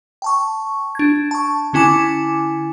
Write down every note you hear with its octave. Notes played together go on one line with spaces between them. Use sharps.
G5 A5 C#6
D4 G#6
A5 C#6
D3 C#4 E4 G#5 D6 E7